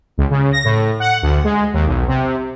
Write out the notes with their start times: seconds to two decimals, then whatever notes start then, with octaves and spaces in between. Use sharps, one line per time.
0.18 C#2
0.30 C#3
0.53 A#6
0.64 A2
1.00 F#5
1.22 D2
1.44 G#3
1.74 D#2
1.87 B1
2.08 C3